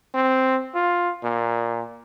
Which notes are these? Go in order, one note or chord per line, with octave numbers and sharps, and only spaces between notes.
C4
F4
A#2